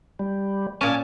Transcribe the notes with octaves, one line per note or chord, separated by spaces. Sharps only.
G3
A#2 C#4 G#5 A5 D6